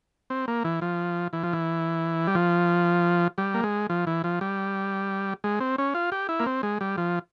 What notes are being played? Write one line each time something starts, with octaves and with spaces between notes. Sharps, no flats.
C4
A#3
E3
F3
E3
F3
E3
G3
F3
G3
A#3
G#3
F3
E3
F3
G3
G#3
C4
C#4
F4
G4
E4
A#3
C4
G#3
G3
F3